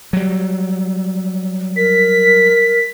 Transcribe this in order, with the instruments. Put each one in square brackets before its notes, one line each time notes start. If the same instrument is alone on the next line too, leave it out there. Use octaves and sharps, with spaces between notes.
[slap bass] F#3 G3
[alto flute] A#4 [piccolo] B6